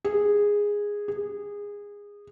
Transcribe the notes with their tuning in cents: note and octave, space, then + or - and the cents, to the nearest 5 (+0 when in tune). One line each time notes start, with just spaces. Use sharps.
G#4 -10
G#4 -20